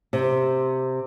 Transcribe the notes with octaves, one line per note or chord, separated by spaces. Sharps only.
C3